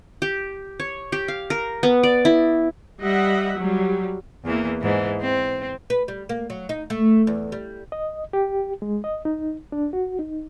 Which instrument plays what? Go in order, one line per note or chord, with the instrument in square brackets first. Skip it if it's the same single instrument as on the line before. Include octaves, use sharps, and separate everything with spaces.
[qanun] G4
C#5
G4
F5
A#4
B3
D5
E4
[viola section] G3 D#5 E5 F#5
F#3 G3
[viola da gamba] E2 E3 A#3
G#2 E3
C4
[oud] B4
G3
A#3
F#3
D#4
A3
E2
G3
[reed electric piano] D#5
G4
G#3
D#5
D#4
D4
F#4
D#4